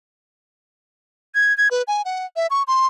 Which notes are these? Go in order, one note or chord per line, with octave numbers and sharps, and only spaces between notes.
G#6
G#6
B4
G#5
F#5
E5
C#6
C6